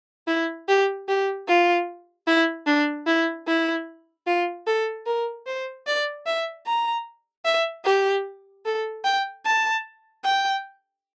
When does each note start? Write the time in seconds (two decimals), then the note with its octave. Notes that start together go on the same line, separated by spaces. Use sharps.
0.28 E4
0.68 G4
1.08 G4
1.48 F4
2.27 E4
2.67 D4
3.07 E4
3.47 E4
4.27 F4
4.67 A4
5.06 A#4
5.46 C5
5.87 D5
6.26 E5
6.67 A#5
7.45 E5
7.85 G4
8.66 A4
9.04 G5
9.46 A5
10.25 G5